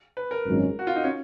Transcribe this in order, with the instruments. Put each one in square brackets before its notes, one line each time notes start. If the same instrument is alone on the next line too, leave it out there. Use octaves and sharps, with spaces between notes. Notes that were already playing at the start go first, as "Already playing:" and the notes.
[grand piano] B4
A#4
[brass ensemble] G#1 F#2 F3 G#3 C#4
[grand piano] F#4
F4
D#4
C#4